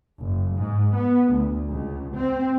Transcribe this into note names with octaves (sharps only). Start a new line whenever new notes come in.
F#1
G#2
B3
D2
C#2
C4